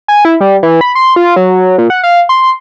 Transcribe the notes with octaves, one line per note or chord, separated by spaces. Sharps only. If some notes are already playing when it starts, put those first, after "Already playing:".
G#5
E4
G3
E3
B5
C6
F4
F#3
A#2
F#5
F5
C6